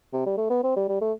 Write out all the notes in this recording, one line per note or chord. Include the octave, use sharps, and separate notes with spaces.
C3
G3
A3
B3
C4
G3
G3
A3